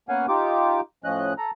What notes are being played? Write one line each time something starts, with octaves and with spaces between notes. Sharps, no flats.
A#3 B3 C#4 F5 F#5 G#5
D#4 F4 G4 D6
A2 F3 C#4 D#5 F#6
A4 A#5